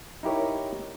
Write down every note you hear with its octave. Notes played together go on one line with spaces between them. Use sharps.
D#4 E4 G4 A#4 C#5